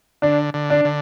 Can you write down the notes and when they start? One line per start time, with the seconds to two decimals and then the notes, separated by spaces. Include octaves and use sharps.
0.22 D3 D4
0.54 D3
0.70 D4
0.85 D3